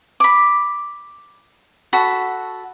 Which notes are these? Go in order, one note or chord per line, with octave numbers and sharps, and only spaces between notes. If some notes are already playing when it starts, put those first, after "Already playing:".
B5 D6
F#4 A4 B5